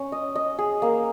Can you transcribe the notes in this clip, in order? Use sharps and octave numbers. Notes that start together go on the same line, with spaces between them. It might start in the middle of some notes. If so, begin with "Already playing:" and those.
Already playing: C#4
D#5
D#5
G#4
A#3